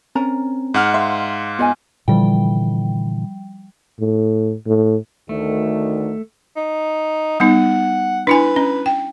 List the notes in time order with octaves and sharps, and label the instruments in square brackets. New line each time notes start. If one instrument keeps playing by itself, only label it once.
[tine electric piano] C4 [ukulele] C#4 A#4 A#5
[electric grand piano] G#2 F#5 F6
[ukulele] E5 [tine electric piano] F5 C6
[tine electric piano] B3 [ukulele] F4 D#5 G#5
[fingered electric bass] A#2 D3 E3 [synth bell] F3 G3 G5
[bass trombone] A2
A2
[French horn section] D2 D#3 [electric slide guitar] A3
[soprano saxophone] D#4
[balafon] G3 B3 D#4 [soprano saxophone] F#5
[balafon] D4 E4 G#5 [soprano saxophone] B4
[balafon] C#4
G5